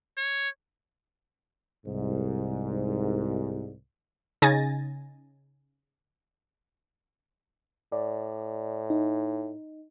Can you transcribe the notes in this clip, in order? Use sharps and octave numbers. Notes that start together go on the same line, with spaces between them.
C#5
C2 G#2
C#3 D#4 G#5 A6 A#6
A2 D5
D#4